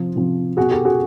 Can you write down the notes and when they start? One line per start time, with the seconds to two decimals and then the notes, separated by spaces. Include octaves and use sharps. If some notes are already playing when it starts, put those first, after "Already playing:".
Already playing: C3 F3
0.16 C3 F3
0.57 B2 F#4 G#4
0.71 G4 A4
0.85 F#4 G#4